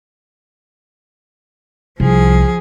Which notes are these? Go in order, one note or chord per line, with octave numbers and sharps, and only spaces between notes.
C2 F3 G#4